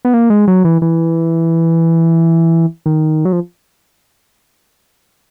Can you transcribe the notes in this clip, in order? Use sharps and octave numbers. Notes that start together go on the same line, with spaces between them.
B3
A#3
G#3
F#3
E3
E3
D#3
F#3
F3